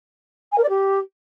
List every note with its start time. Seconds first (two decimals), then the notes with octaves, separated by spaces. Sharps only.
0.52 G#5
0.58 A#4
0.63 D5
0.69 G4